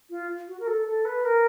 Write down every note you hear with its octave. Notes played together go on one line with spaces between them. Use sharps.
F4
F#4
A#4
A4
A4
B4
A#4